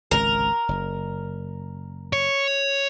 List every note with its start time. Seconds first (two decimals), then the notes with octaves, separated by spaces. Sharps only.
0.11 G#1 C#2 C3 A#4
0.69 F#1
2.13 C#5